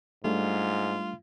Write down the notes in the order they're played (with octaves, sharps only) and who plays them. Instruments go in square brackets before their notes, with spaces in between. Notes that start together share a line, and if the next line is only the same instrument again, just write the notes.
[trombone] G#2 [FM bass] G3 [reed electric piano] A3 D4 [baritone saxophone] F4